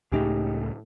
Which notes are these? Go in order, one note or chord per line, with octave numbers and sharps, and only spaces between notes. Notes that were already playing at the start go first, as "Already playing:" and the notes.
C#2 A2 A3 D#4 G4 G#4